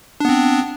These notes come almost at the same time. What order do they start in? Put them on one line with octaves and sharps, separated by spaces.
D4 B3 C4